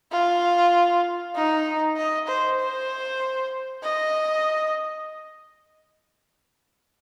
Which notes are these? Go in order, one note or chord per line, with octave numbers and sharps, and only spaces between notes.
F4
D#4
D#5
C5
C5
D#5